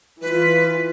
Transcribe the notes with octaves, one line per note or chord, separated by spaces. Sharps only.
E3 F4 B4